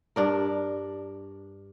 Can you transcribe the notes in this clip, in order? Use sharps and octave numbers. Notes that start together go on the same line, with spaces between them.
G2 D4 A#4